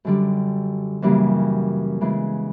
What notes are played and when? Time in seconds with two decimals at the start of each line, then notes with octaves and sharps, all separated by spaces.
0.05 F#2 D3 G3
1.02 F#2 C#3 E3 G3 A#3
2.01 C#3 E3 G#3 B3 E4